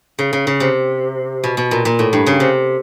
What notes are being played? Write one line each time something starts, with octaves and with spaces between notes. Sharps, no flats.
C#3
C#3
C#3
C3
B2
B2
A#2
A#2
A2
G2
C#3
C3